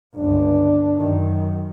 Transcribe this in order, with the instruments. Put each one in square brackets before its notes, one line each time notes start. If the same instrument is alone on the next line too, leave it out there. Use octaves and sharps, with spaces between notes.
[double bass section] G1 C#2 [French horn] D4
[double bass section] F#2 D#3